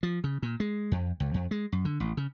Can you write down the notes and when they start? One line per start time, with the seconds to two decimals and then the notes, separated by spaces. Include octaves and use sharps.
0.03 F3
0.24 C#3
0.42 A#2
0.60 G#3
0.92 F2
1.20 C#2
1.34 F2
1.51 G#3
1.72 F#2
1.85 D3
2.00 A1
2.17 C#3